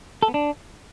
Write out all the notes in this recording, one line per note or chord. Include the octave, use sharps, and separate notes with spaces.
A4
B3
D4